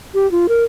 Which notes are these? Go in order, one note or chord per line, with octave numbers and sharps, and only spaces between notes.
G4
F4
A#4